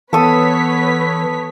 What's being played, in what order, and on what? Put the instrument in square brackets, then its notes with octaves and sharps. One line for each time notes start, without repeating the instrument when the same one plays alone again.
[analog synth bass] E3 [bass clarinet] B3 [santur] A4 D#6 [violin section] B4 C#5 B6